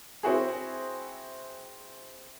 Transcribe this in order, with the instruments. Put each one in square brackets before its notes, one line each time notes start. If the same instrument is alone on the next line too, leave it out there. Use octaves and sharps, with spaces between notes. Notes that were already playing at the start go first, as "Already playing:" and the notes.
[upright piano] C4 E4 F#4 G#4